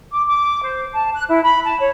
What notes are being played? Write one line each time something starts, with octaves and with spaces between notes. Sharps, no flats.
D6
D6
C5
A5
F#6
E4
B5
A5
C#5